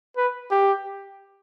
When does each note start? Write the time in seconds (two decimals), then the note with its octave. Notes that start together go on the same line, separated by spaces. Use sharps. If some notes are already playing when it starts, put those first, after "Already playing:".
0.17 B4
0.51 G4